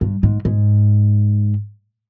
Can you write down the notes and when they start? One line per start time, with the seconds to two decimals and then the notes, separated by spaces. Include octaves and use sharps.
0.01 G2
0.23 G#2
0.45 G#2